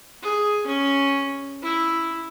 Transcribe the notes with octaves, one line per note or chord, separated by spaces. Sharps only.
G#4
C#4
E4